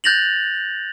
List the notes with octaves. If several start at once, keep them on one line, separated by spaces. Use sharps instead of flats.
F#6 G6 A6 A#6 F7 F#7